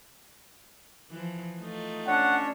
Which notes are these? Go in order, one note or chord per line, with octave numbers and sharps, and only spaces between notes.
E3 F3
A3 D#4 F4
C#4 D4 C#5 F#5